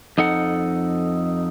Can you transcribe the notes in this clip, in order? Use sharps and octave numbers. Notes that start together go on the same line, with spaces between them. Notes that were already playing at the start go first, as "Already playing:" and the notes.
F2 D#4 A4 F#5